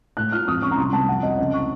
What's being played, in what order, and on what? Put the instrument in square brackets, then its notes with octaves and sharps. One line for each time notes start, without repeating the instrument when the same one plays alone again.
[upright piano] A2 F#6
F4 F6
F2 D#6
C#4 C#6
A#5
C2 C6
C2 A5
F2 F#5
F2 D#5
C#2 D#5
C#6